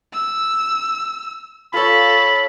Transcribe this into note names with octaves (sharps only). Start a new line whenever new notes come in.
E6
F4 A4 C#5 B5